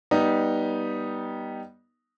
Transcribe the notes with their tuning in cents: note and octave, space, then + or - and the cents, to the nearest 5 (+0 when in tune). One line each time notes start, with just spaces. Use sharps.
G3 -10 B3 -20 D#4 +0